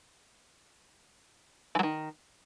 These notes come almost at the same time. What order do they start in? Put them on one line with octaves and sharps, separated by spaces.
E3 F#3 D#3